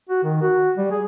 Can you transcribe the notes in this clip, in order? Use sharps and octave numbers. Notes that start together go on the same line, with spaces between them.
F#4
D#3
F#4
G3
G#4